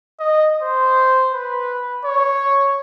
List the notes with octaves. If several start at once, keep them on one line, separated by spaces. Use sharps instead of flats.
D#5
C5
B4
C#5